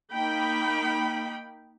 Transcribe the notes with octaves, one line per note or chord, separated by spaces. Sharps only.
A#3 D#4 G5 B5